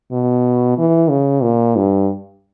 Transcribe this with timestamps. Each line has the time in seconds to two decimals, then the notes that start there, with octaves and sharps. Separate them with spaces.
0.12 B2
0.78 E3
1.10 C#3
1.43 A#2
1.76 G2